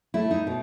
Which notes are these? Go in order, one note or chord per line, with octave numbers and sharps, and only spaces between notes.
A3 E4
D#4
B2